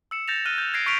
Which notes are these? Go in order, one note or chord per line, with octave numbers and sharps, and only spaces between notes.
E6 C#7 E7
G6 A6 A#6 E7 F7
F6 F#6 D#7 G7
G6
G#6 A#6 C7 D7 E7
C#6 F6 B6 C7 D7 F7